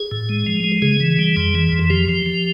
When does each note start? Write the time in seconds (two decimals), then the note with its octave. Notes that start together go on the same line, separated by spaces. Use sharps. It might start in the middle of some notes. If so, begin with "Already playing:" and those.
Already playing: G#4
0.11 A2
0.29 G#3
0.47 F3
0.64 G#3
0.82 C#3 G#4
1.00 E3
1.19 G3
1.37 F2
1.55 E3
1.72 F2
1.90 F3 G4
2.09 F3
2.26 F3